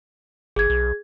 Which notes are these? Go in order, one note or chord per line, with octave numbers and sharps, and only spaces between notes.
G1 G#4 G#6
B1